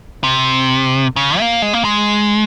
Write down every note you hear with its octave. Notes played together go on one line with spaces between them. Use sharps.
C3
C#3
A#3
G#3
A#3
G#3